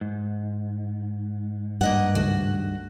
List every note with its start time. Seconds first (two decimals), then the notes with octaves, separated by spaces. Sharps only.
0.01 G#2
1.81 G2 A#3 D#5 F#5
2.15 C#2 D#3 A3 F#4